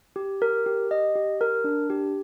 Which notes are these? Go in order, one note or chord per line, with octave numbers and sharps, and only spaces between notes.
G4
A#4
G4
D#5
G4
A#4
D4
G4